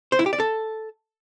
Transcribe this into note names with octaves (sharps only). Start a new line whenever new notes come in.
C5
E4
G4
D5
A4